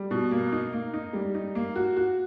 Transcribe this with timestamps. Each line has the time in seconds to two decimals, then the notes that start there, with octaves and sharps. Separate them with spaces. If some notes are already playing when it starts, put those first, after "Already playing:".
Already playing: G3
0.11 B2
0.31 A#3
0.52 D#4
0.73 A#3
0.93 D#4
1.13 G3
1.35 D#4
1.55 A#3
1.76 F#4
1.97 F#4